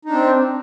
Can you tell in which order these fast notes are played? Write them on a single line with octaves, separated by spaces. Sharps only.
D#4 D4 C4